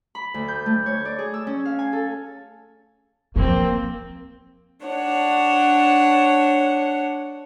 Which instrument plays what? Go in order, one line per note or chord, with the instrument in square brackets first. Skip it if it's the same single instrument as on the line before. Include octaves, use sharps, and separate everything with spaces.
[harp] B5
D2
G6
A3
C#5
D5
G#4
E6
C#4
F5
G#5
A4
[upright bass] F3 [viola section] A#3 C4
[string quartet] D4 C#5 F#5